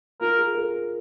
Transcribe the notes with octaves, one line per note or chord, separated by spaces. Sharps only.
F4 A#4
G#4
A#4